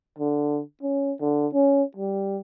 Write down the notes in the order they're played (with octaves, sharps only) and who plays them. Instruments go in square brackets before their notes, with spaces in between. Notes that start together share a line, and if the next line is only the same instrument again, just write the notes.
[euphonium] D3
C#4
D3
C#4
G3